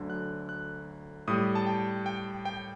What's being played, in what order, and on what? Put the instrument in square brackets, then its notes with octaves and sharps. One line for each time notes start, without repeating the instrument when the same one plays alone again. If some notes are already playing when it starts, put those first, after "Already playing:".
Already playing: [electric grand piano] D2 D3 F#3
F#6
F#6
A2 G3 D#6
A5
G5
G5
G5